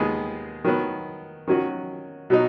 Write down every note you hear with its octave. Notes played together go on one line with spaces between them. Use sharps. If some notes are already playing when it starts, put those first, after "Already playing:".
Already playing: D#2 D#3 G#3 B3 G#4
D#3 F#3 B3
D#3 F#3 C#4 F#4
B2 F#3 D#4